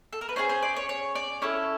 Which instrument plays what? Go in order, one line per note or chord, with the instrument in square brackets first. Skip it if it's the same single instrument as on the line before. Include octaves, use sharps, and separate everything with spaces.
[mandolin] A4
A#4
B4
C#4 F4 G#4 C5
C5
D5
C#5
C#5
D5
C#4 E4 A4